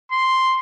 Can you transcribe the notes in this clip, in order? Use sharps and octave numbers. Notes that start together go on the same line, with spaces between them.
C6